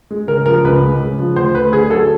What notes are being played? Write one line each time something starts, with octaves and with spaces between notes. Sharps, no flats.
G#3
C#3 A#4
F3 A#4
C#2 B4
G#3
C#3
F3
D2 C5
A3 B4
D3 G#4
F#3 A4